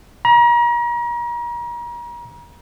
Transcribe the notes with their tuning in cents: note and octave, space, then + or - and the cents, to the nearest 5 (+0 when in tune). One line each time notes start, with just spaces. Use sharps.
A#5 +35